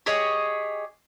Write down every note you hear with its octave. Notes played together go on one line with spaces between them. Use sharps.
G4 G#4 C#5 D#5